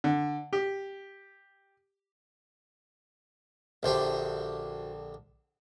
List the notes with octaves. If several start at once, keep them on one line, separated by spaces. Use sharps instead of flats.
D3
G4
A#1 D3 F#4 G4 C5 E5